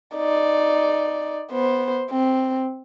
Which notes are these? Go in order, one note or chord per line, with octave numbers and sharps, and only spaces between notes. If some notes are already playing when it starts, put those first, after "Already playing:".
D#4 D5
B3 C5
C4